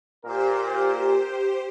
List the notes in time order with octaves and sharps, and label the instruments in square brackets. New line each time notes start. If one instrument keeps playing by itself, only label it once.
[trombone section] A#2 A#4 [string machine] G4 C5